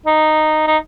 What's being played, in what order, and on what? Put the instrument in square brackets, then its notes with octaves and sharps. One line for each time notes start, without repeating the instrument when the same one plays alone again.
[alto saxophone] D#4
D#4